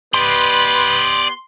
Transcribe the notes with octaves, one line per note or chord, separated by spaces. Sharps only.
B3 G4 B4 D5 D#5 C6